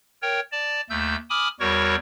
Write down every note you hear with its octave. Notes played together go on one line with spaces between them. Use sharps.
A#4 C#5 G5
D5 A5
D#2 A3 E6 G6
G#5 B5 D6 D#6 F6
E2 G3 F#4 A#4 C#5 C#6